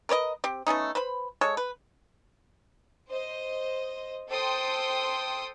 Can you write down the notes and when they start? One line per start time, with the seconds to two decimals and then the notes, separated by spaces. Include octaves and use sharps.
0.09 A#4 B4 C#5 D#5
0.44 C4 G4
0.67 A3 B3 C#4 D#4
0.95 B4 C5 B5
1.41 G#3 A4 C#5
1.57 B4
3.09 C5 D#5
4.29 A4 C5 G5 C6 D#6